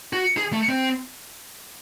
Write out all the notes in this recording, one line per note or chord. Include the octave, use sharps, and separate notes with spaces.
F#4
G#4
A3
C4